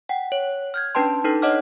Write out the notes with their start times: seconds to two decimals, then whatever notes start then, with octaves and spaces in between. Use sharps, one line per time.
0.09 F#5 G5
0.32 C#5
0.74 F6 G6 G#6
0.95 C#4 D4 B4 G5 A5 C6
1.24 D4 D#4 A4 B4
1.42 C#5 D#5 F#5 D6 F6